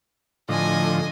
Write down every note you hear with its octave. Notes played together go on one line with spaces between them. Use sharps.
A2 D3 F3 D#5 G#5